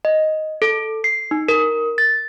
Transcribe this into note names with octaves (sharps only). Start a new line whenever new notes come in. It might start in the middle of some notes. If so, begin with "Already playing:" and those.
D#5
A4
C7
D#4
A#4
A6